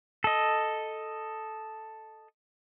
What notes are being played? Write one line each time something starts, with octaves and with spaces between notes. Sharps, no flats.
A4 D#5